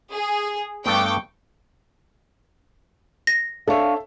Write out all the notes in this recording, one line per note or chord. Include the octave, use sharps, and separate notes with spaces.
G#4
G2 A3 B3 G5 C#6 D6
A#6
D4 A4 C#5 E5 F5